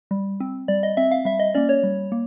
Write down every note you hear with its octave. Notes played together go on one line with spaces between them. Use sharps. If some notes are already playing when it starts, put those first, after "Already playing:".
G3
C4
G3 D5
D#5
C4 E5
F5
G3 E5
D#5
A#3 C#4 D5
C#5
G3
A#3